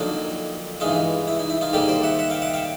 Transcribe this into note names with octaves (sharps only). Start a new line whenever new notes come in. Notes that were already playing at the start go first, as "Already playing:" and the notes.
Already playing: F2 D3 F#3 A#3 D4 D#4 F4
G2 E3 G#3 D#4 F4
E4
D#4
E4
D#4 F4
G#2 D#3 G3 A#3 D#4 G4 A4
C5 D5
E5 F#5
E5 F#5
F5 G5
E5 F#5
F5 G5